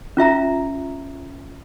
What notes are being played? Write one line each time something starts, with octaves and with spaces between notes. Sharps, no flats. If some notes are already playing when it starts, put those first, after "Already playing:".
C#4 F4 E5 A#5